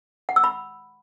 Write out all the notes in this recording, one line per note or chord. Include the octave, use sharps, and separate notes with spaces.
F#5
E6
B5